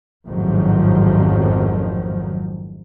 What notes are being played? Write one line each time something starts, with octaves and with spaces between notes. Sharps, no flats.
A1 F2 G#2 D#3 F3 F#3